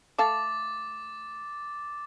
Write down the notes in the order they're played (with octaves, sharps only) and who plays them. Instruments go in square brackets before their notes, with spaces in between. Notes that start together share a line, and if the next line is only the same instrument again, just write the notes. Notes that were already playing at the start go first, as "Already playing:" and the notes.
[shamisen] A3 F5 A5 [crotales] D6 A6